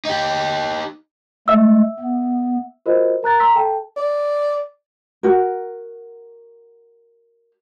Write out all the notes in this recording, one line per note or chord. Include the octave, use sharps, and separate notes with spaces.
D#4 G4
G#3 A3 E5 E6
B3
F4 F#4 A#4 C5 D#5
A#4 A#5 F#6 A6
A#5 C6 E6 B6
A4 G5 A5
D5
F#4 A#4